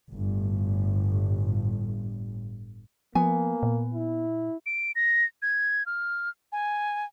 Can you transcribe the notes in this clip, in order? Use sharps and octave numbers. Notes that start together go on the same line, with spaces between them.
G1 A2
F3 A#3 B3 G#5
A#2
E4
D7
A#6
G#6
F6
G#5